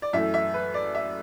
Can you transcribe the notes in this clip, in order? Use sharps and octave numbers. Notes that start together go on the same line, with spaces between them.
D5
F#2 E3 A3 E5
E5
B4
D5
E5